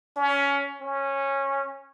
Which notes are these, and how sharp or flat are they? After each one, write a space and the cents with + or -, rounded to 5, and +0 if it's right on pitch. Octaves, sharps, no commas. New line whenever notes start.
C#4 +20
C#4 -15